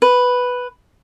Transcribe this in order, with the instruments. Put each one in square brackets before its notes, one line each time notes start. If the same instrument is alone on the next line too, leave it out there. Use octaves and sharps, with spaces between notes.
[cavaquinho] B4